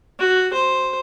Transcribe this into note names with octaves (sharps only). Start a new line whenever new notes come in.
F#4
C5